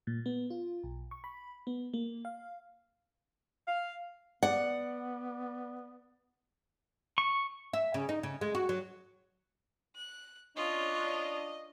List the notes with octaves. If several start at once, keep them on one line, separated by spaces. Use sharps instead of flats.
A#2
B3
F4
B1
C#6
B5
B3
A#3
F5
F5
B3 D5 F#5
C#6
E5
C#3
D#4
C#3
G#3
F#4
F#3
F#6
C#4 D4 F4 C#5 D#5